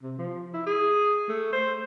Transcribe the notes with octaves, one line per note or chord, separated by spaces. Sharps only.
C3
F3
E4
G#4
A3
C5